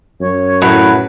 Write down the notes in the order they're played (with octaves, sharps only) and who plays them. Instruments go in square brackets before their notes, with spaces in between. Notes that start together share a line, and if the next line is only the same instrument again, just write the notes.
[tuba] F#2 [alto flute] C#5
[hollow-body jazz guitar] A2 F#3 [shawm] B4